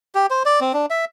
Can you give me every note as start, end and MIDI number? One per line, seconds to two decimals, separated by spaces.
0.15 0.26 67
0.30 0.43 72
0.46 0.60 74
0.61 0.72 60
0.74 0.86 62
0.90 1.05 76